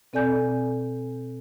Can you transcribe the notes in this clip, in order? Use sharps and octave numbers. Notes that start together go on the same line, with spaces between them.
B2 C4 A4 D5 G#5 G6